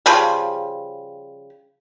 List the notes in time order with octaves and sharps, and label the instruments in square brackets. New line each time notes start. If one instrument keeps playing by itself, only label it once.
[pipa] C#3 F3 G3